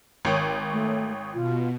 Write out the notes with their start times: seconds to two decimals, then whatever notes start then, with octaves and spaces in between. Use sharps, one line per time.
0.25 G#1 C#5 G5 D#6
0.72 A3
1.34 B2 F4